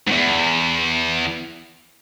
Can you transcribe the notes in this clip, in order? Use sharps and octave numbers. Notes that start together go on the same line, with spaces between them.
E2 G#2